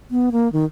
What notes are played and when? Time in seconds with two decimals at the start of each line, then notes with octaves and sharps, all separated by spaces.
0.11 B3
0.32 A#3
0.53 D#3